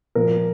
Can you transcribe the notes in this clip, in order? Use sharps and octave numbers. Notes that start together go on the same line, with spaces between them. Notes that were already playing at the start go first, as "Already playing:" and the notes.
A#2 F3 A#3 A#4